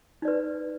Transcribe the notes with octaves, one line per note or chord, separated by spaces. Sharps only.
D#4 B4 D5